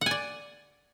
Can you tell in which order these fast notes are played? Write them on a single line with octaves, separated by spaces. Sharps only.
F#5 G#5 D5